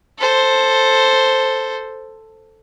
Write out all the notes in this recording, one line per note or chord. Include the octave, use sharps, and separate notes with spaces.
A4 C5